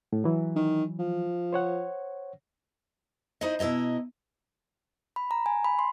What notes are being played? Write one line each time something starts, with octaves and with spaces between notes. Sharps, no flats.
A2
E3 F#3
D#3
F3
C5 C#5 F#5
D#4 E4 C5 D#5
B2 E4 C#5 D#5 A#5
B5
A#5
G#5
B5
C6